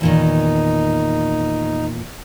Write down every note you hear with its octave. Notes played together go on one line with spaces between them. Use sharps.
E2 A#2 D#3 D#4